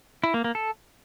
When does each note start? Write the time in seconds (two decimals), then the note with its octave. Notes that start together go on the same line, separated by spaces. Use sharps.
0.24 E4
0.34 A#3
0.44 A#3
0.55 A4